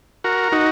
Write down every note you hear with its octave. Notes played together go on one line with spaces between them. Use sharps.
F#4 A#4
D#4 F#4